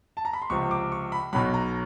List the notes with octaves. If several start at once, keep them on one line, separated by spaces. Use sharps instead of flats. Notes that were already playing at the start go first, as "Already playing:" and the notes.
A5
A#5
B5
C6
C#2 C3 F3 C#6
D6
C#6
B5
B1 B2 F#3 B5
A#5